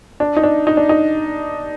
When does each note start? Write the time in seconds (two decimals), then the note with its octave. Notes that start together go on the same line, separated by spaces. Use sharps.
0.20 D4
0.37 D#4
0.43 D4
0.67 D#4
0.77 D4
0.89 D#4